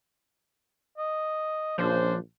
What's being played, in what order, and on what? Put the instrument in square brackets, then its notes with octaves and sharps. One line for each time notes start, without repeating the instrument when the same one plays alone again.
[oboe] D#5
[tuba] A#1 [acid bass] F3 [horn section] C#4 C5 [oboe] D4